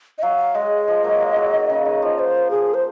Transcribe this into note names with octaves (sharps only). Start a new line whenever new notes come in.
D#5
F#3 F5
G#3 D#5
F3
F#3 A#3
G#3
F#3
D#3
C#3
D#3
F3
C5
G#4
C5